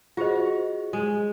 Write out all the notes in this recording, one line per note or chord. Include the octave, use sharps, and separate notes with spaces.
F4 F#4 G#4 C5 D#5
G#3